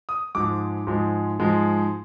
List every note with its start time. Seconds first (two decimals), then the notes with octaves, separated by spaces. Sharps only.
0.09 D#6
0.35 G#2 F3 G#3 D6
0.87 G#2 F3 G#3
1.40 G#2 F3 G#3